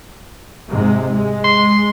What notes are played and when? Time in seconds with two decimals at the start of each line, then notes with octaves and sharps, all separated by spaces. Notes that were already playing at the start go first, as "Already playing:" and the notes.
0.69 G#2 C3 G#3
1.12 G#3
1.44 C6